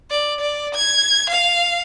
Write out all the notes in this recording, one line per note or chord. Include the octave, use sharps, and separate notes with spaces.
D5
D5
G#6
F5